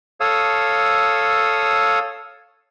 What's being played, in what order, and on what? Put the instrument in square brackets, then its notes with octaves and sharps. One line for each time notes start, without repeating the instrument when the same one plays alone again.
[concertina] A4 C#5 F5 D#6 E6